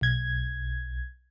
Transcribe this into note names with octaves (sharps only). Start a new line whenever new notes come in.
B1 G#6